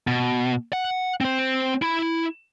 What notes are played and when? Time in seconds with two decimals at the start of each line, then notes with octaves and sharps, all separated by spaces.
0.08 B2
0.73 F#5
1.21 C4 C5
1.82 E4 B5